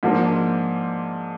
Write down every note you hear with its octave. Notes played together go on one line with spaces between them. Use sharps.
G#2 F3 A#3 D4